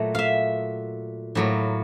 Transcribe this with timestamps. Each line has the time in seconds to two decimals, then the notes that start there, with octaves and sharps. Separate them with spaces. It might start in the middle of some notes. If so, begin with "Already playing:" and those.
Already playing: A#2 F#3 A3
0.15 E5 F5
1.35 A2 F#3 A#3